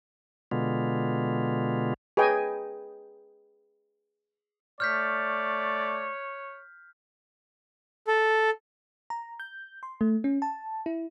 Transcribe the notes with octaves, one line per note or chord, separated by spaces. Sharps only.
B2 D3 G#3 B3 F4
G#4 B4 D#5 G5 G#5
A3 C#5 D5 F6 G6 B6
A4
A#5
G6
C6
A3
C#4
A5
E4